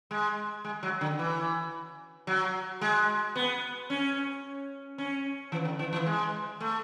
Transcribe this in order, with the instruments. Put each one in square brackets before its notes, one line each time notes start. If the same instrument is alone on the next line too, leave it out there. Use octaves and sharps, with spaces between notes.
[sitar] G#3
G#3
F#3
D3
E3
F#3
G#3
B3
C#4
C#4
E3
D3
E3
E3
G#3
A3